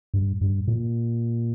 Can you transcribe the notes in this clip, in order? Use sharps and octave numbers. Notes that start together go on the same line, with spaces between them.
G2
G2
A#2